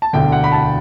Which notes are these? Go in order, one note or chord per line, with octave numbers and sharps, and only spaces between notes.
A5
E1 D2 D3 G5
F#5
B5
A5